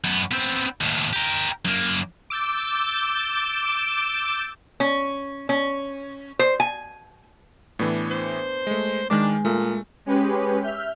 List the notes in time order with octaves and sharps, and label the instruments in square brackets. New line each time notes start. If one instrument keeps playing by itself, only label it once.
[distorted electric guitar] F#2 B3
B3 C4
D#2 A2
G4 A#4
F#2 A#3
[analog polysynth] D6 E6 G6 A6
[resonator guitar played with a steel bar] C#4
C#4
C5
G#5
[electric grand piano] A2 E3 [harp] B3 D4
[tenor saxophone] C5
[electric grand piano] G#3 A3
[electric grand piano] D#3 A#4 D6 [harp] G#3 [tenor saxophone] D4
[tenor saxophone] A#2 [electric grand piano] A3
[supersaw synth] G#3 C#4 G4 B4
E5 F6 G6